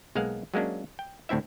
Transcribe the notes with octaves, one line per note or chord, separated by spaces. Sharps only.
B1 G#3 A#3 F5 F#5
F#3 G#3 A#3 C#4 D4
G5
D2 A2 C4 E4 E5